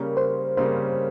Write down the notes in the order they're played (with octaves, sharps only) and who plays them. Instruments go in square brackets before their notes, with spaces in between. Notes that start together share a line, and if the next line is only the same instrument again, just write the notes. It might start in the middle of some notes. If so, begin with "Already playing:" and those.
Already playing: [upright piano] C#3 G3 A#3 C#4 [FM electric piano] A#4
[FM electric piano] C5
[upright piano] C#3 G3 A#3 C#4 [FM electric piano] C5